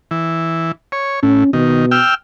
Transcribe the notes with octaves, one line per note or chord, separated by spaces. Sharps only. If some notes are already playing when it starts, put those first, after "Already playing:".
E3
C#5
A2 C#4
B2 D#3
G5 E6 F6